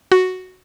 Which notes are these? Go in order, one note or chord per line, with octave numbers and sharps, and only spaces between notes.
F#4